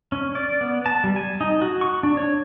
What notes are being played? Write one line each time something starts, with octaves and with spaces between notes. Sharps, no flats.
C#4
D5
B3
A5
G3
G#5
D#4
F#4
C#6
D4
C#5